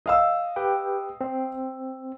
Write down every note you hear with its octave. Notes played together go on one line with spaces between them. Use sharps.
D#5 F5 E6
G4 B4 G5
C4